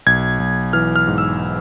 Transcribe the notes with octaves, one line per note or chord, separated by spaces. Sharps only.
B1 G#6
B1
E3 F6
F6
G#2
E6